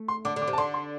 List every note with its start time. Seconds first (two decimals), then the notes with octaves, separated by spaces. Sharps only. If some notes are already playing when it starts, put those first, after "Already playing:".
Already playing: A3
0.08 C6
0.25 D3 D6
0.36 D3
0.42 D6
0.48 C3
0.53 A5
0.58 D3 C6
0.74 C6